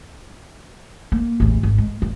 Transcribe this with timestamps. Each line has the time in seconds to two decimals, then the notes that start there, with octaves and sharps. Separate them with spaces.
1.12 A#3
1.40 A1 E2
1.63 G#1
1.78 G#3
2.02 G2